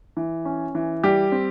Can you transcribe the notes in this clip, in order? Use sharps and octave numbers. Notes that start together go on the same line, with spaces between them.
E3
C#4
E3
G3 G4
C4